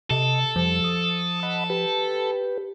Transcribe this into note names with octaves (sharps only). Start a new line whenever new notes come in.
C3 A4 D#5
F2 F3 G3
D#6
D#5 F#5 B5
G4 B4